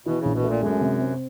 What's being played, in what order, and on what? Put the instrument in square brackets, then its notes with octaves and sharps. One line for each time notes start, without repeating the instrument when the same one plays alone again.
[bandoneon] B2 [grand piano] E3
[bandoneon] C#3
[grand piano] A#1
[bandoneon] B2
[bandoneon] A#2 [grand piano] A3
[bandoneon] F#2 [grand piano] G#3
[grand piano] C3
C4